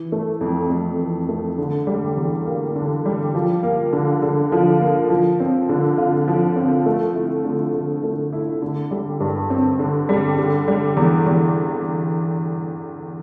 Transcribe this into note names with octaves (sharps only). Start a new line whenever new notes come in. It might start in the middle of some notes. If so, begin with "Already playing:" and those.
Already playing: E3
A3
F2
F2
E3
A3
D3
G3
E2
A#3
D3
G3
F3
A#3
D3
D3
F3
A#3
F3
C4
D3
F4
F3
C4
A3
E4
D3
D3
A3
E4
D3
G3
G2
C4
D3
G3
D3
G3
E2
E2